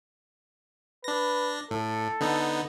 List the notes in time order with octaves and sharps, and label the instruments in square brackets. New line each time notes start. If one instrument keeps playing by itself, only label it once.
[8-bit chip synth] D4 A#6 [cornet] B4
[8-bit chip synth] A2 [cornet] A4
[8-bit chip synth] D3 B3 D#4